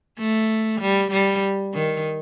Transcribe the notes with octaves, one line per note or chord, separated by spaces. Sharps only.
A3
G3
G3
D#3